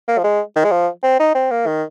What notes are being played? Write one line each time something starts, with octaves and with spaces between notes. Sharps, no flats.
A#3
F3
G#3
D#3
G#3
F3
C4
D#4
C4
A#3
D#3